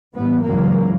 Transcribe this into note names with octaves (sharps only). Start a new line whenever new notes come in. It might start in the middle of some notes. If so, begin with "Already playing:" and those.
A2 E3 G3 B3
C#2 G2 E3 F#3 A#3